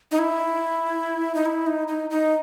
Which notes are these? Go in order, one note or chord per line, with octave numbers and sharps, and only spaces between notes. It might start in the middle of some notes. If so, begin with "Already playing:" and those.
D#4
E4
D#4
E4
D#4
D#4
D#4